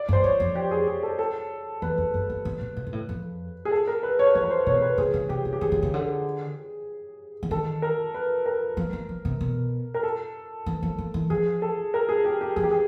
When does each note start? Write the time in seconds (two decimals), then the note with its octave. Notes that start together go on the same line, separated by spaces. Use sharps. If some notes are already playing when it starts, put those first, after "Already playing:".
Already playing: D5
0.09 G2
0.13 C5
0.24 F#2 C#5
0.40 F2
0.55 G4
0.71 G#4
0.87 G#4
1.03 A4
1.19 A4
1.82 E2 B4
1.98 F2
2.14 F#2
2.30 G2
2.45 G#2
2.61 A#2
2.77 A#2
2.87 A#2
2.93 A2
3.09 F2
3.65 G#4
3.71 A4
3.87 A#4
4.03 B4
4.19 C#5
4.35 F2 C#5
4.43 B4
4.50 C5
4.66 B2 C#5
4.82 B4
4.98 C#3 G#4
5.14 C#3
5.29 C3 G4
5.45 C#3
5.53 G4
5.61 D#3 G#4
5.72 D3
5.83 C#3
5.94 D3
7.43 E3
7.51 D#3 A4
7.82 A#4
8.14 B4
8.46 A#4
8.77 F3
8.93 F3
9.09 F3
9.25 C3
9.41 B2
9.94 A#4
10.03 A4
10.66 E3
10.83 F3
10.99 F3
11.14 E3
11.30 F3 G#4
11.62 A4
11.94 A#4
12.09 G#4
12.25 G4
12.41 G4
12.56 F3 G#4
12.63 G4
12.71 G#4